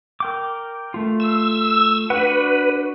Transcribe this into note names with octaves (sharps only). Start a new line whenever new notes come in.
A#4 G5 D6
A3 F4
E6
D4 F#4 B4 F#5